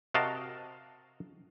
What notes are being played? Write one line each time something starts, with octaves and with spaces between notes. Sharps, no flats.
C3 F#4 A#4 D#5 F5 A5